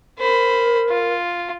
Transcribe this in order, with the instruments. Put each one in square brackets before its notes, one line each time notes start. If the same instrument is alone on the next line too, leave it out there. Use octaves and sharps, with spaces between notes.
[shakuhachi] A#4 [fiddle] C5 B5
[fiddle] F4